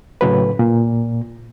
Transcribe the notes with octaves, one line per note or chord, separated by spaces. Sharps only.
A2 C#3 F#3 B4
A#2